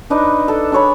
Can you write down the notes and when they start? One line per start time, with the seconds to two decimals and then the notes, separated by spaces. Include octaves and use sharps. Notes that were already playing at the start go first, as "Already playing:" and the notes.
0.10 D4 D#4 B4
0.48 A4
0.72 D4 G#4 C#5 B5